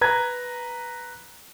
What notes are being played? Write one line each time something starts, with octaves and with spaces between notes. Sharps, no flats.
B4 A#5 G#6